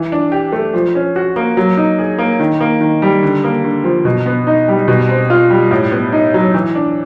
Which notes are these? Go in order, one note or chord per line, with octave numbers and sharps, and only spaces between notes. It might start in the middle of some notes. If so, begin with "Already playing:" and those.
Already playing: E3
D4
G4
A3
F3
C#4
F#4
A#3
F#3
D#4
G#4
A#3
D#3
A#3
D#3
G3
D3
A#3
D3
F3
B2
B3
D#4
G3
B2
C4
F4
G3
A2
B3
D#4
F#3
E3
D4